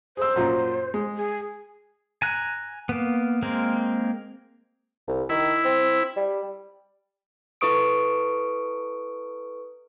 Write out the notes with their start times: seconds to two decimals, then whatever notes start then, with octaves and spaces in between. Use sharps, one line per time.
0.17 G#4 C5 E6
0.36 F#2 A#2
0.94 G#3
1.17 G#4
2.22 G#5 A#5 F#6
2.89 A#3 B3
3.42 G#3 A#3 C4 A#4
5.08 C2
5.29 D#3 E4
5.65 C4
6.16 G3
7.61 E4 A4 B4 C#6 D#6 D7